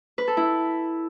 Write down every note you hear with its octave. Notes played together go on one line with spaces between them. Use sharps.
B4
A4
E4